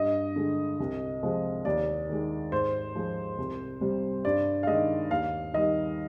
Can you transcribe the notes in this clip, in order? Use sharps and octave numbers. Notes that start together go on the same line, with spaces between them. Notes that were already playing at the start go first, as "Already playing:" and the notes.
Already playing: G2 D#5
D3 G#3
C2
C3 F3 G#3
D#2 D5
D#3 G#3
G#2 C5
F3 G#3
C2
C3 G3
G2 D5
F5
D#3 G#3 D#5
D#2 F5
D#3 G3 D#5